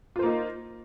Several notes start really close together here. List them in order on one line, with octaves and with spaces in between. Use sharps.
F4 C5 A#3 D#4